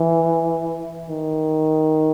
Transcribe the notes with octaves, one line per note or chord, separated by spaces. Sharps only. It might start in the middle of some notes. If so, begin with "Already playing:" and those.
Already playing: E3
D#3